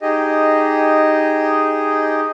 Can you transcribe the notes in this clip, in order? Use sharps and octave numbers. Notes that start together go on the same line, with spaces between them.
D#4 G4 G#4 D#5